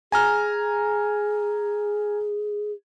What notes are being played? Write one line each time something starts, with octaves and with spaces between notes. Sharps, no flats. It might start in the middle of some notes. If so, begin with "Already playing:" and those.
G#4 G#5 A#5 F6